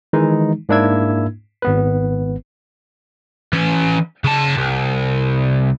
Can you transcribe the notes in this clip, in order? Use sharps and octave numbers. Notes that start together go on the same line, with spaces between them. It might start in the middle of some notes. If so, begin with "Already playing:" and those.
D#3 E3 G#3 D#4
G#2 A#3 D4 E4 E6 G#6
G#1 B3 B4
E3 C#4
C#3 A5
C2